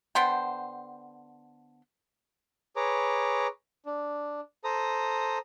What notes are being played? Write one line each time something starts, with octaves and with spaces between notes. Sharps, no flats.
D3 B3 C5 G5
G#4 B4 C#5 A#5 D6
D4
A4 C5 A#5 D#6